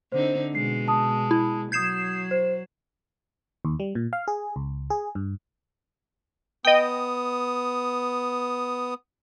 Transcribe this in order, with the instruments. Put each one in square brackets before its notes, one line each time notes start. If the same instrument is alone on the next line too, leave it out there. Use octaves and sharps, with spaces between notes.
[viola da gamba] D3 C4 D#4 [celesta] C5
[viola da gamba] B2 G#3 [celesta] C7
[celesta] A5 D#6
[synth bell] E4
[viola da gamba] F#3 [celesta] D#6 G6 [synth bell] G#6 C7 E7
[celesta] C5
[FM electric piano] D#2
G3
A#2
F5
G#4
C#2
G#4
G2
[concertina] B3 D#6 [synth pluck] D#5 G5